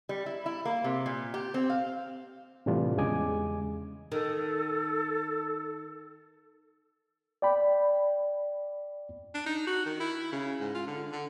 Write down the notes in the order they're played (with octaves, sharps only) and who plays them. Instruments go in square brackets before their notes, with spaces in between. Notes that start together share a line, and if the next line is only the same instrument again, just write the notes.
[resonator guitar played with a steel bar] G3
E4
E4
A#3
C3
A#2
G4
C4
F5
[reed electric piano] A2 C3 E3 G3 D4 F4
E2 C#3 G#3 D#5 G#5 D6
[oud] D#3 [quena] A4
[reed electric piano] D5 G5 B5
[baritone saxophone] D4
D#4
F#4
D#3
E4
C#3
G#2
F4
D3
D3